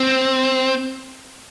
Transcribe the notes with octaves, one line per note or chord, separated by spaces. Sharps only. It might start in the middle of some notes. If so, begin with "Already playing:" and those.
Already playing: C4